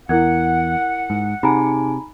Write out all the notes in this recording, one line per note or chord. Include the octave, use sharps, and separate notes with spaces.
E2 E4 A#4 F#5 G#6
G#2
C3 D#4 G#4 G#5 A#5 B5